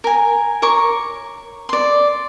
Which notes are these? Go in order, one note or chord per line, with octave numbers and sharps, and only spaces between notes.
A#4 G#5
A#4 C#5 C#6 D6
D5 C6